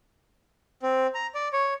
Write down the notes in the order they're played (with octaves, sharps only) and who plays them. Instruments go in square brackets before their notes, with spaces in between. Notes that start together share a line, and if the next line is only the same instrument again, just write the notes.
[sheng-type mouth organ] C4
A#5
D5
C#5